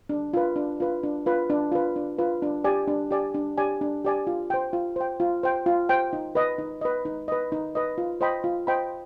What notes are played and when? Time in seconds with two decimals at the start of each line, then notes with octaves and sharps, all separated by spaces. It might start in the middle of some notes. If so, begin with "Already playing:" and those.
0.09 D4
0.33 F4 B4
0.56 D4
0.80 F4 B4
1.03 D4
1.26 F4 B4
1.50 D4
1.72 F4 B4
1.96 D4
2.18 F4 B4
2.42 D4
2.64 G4 D5 G#5
2.88 D4
3.11 G4 D5 G#5
3.34 D4
3.58 G4 D5 G#5
3.81 D4
4.05 G4 D5 G#5
4.27 F4
4.50 C5 G5
4.73 F4
4.96 C5 G5
5.20 F4
5.43 C5 G5
5.66 F4
5.89 C5 G5
6.13 D#4
6.35 B4 D#5
6.58 D#4
6.81 B4 D#5
7.05 D#4
7.28 B4 D#5
7.52 D#4
7.75 B4 D#5
7.98 F4
8.21 C5 D#5 G5 B5
8.44 F4
8.67 C5 D#5 G5 B5